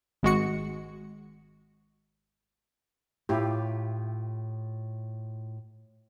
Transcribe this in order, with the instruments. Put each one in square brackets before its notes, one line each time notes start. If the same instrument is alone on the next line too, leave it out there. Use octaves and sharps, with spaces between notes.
[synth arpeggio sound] G#1 G#3 F#4 C#7
[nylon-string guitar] A2 F4 G5 [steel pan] E4 G4